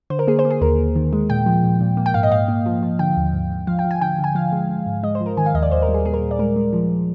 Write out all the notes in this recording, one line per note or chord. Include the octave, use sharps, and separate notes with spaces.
D3 C5
A#4
A#3 G#4
C5
A#3
G#4
D#2 A#4
D#2
D#3
G#3
A#2 G5
F3
A#2
A#2
A#3
G5
G#2 F5
D#5
G#2 F5
A#3
F3
F3
D3 G5
D#2
G#2
G#2
F3 F5
G5
F3
G#5
D3 G5
D3
G#5
F3 F5
G#3
G#3
G#2
G#3 D#5
C5
F3
A#4
D#3 G#5
F5
D#2 D#5
D5
D#2 C5
A#4
G3
G#4
A#2 G#4
A#4
A#2
D5
G#3 A#4
G#3
F3